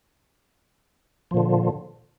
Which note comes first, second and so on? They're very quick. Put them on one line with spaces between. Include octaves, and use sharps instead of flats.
F3 A#2 D3